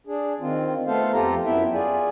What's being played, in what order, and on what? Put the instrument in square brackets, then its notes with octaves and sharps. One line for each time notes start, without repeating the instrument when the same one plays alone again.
[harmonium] D4 G#4
D#3 C4 F4
A3 B3 A4 C5 F5
F2 F4 G4 A4 A#5
F#2 B3 E4 E5 G5
F4 G#4 D5 G#5